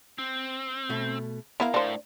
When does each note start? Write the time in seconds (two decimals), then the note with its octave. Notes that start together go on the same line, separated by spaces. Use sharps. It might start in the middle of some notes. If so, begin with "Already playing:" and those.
0.18 C4
0.89 B2 A3
1.60 B3 E4 A#4 F5
1.74 A2 D4 C5